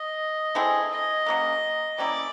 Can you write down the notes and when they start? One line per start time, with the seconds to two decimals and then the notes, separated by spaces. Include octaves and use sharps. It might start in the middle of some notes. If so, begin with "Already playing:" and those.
Already playing: D#5
0.55 A3 C4 E4 G#4
0.91 D#5
1.26 C#3 F#3 A#3
1.98 G3 A#3 C#4 E4 D5